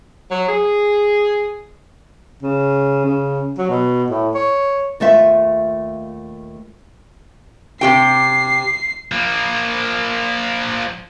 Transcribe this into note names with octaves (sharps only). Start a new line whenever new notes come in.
F#3
G#4
C#3
C#3
F#3
B2
A2
C#5
D#2 A3 F4 E5
C3 G4 G5 C7
F3 A#3